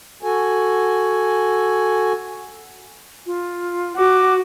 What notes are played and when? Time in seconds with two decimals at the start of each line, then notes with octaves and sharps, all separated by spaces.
0.23 F#4 A4 G#5
3.27 F4
3.97 F#4 D6